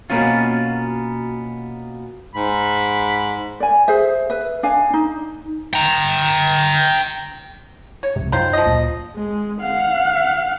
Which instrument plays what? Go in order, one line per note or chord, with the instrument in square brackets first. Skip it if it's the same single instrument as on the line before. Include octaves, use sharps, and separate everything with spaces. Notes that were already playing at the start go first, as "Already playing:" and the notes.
[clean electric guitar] B2 F#3 A#3 B3 C#4 F4
[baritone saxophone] G#2 [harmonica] B5
[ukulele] D5 G#5
G#4 C5 E5
B4 E5
D4 F5 G#5
D#4
[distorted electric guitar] G5 A#5
[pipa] C#5
[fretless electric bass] C2 F2 G#2 [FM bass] C3
[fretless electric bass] F#2 [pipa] D#3 F4 C5
[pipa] F3 D#5
[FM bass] D2 [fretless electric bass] A#2
[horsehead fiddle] G#3
F5 F#5